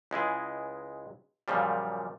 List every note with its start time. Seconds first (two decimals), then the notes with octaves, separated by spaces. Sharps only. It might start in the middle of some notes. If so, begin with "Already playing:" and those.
0.11 C#2 G#3 E4 G#4
1.48 F#2 A#2 C#3 F3 G3